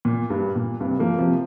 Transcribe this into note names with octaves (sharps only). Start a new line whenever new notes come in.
A#2
G2
A#2
G2 C3
F3 A#3
C3 F3